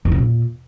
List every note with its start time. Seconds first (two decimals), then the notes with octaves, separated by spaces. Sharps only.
0.05 E2
0.12 C#3
0.18 A#2